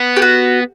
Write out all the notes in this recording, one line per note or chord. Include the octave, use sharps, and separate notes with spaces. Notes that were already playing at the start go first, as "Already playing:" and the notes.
Already playing: B3
G4
F#4